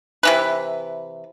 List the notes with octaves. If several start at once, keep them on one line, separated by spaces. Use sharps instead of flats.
C3 E3 B4